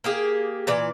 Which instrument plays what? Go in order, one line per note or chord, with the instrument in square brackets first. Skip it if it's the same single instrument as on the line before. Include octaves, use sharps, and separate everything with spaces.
[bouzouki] A#3 G4 G#4
A#2 E3 D5